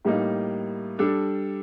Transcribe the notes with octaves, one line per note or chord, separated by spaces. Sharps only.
A2 G3 A#3 D#4
G3 D4 A4